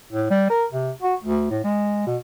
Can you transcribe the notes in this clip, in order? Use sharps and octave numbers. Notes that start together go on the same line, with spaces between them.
A2
G3
A#4
C3
F#4
D2
A2
G#3
B2